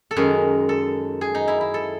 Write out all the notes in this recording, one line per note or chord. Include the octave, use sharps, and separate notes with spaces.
A4
F#2 D#3 G#3 C#4 G#4
A4
G#4
D#4
E4
E4
A4